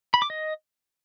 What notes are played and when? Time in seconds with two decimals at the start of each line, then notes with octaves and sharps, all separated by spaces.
0.14 B5
0.22 D6
0.30 D#5